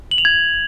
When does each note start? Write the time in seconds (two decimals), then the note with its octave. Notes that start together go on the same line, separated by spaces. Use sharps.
0.11 F#7
0.18 F7
0.25 G#6